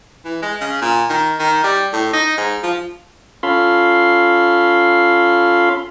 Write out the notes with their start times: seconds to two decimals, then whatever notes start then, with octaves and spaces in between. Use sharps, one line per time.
0.25 E3
0.42 G#3
0.61 C#3
0.81 A#2
1.10 D#3
1.40 D#3
1.64 G3
1.93 A2
2.13 D#4
2.38 G#2
2.63 F3
3.43 C#4 F4 A4 F5 B5 C6